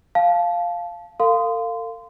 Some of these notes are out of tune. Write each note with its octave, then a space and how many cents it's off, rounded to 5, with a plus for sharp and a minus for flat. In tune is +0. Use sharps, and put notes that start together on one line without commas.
F5 +0 A5 -20
A4 +45 F5 +0 C6 -25